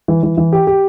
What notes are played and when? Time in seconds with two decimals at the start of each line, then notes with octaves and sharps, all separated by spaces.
0.08 E3
0.23 E3
0.38 E3
0.53 G4
0.67 G4